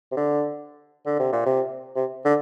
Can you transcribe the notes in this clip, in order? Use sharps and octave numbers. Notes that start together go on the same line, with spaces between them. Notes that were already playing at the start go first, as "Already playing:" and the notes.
C3
D3
D3
C3
A#2
C3
C3
D3